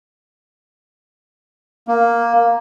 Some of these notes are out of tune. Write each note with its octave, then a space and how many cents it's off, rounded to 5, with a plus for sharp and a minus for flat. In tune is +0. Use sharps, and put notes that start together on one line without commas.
A#3 +5